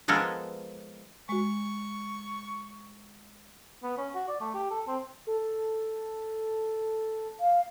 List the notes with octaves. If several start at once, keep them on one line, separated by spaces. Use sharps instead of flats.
F3 G#3 B3 A4 A#4
G#3 F#4 C#6
B3
C#4
F#4
D5
A3
G4
A4
C4
A4
F5